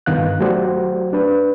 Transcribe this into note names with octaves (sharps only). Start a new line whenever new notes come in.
G2 D#3 B3 F5 F#6
F#3 A3 F#4 G4 C5 D5
D4 B4